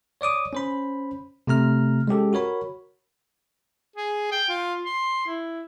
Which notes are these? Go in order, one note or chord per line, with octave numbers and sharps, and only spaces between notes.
C#5 D5 D6 D#6
C#4 C5 B5
C3 A3 A#5 F6
G#3 C#4 G4 A4
F#4 A#4 C#5 B5
G#4
G5
F4
C6
E4